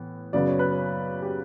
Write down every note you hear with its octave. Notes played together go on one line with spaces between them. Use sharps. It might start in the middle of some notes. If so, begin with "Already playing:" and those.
Already playing: A2 E3 B3
F#2 C#3 F#3 B3 D5
C#5
B4
C#5
G4